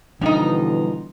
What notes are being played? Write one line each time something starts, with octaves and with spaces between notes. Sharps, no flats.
B2 D3 E3 F3 G3 D4 D#4